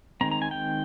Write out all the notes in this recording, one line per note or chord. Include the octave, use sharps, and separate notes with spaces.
D#3 G#3 C4 A#5
A#5
G#5
G5